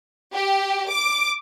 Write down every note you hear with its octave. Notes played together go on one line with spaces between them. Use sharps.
G4
D6